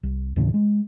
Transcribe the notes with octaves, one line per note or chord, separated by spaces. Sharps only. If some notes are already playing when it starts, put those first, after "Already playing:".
C2
D#2 A2 C#3 E3
G#3